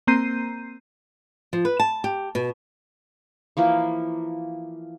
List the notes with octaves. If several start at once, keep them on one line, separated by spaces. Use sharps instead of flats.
A#3 C4 A#5 G6 C7 D#7
F3
B4
A5
G4
B2
E3 F3 A#3